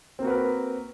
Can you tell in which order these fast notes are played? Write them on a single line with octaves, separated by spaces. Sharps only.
C4 A#3 F#4 B4 A#4